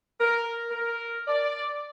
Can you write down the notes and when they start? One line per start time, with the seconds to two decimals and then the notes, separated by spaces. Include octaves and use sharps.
0.20 A#4
0.70 A#4
1.27 D5